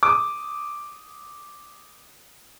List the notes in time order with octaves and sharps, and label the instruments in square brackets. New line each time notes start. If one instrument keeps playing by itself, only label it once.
[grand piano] D6 D#6